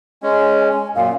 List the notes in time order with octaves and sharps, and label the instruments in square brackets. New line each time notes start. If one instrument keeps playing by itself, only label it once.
[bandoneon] G#3 C#4 [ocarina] G#5
[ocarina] G#5
[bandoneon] F#2 A#2 [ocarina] F5